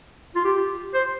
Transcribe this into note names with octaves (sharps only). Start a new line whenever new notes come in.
F4
G4
C5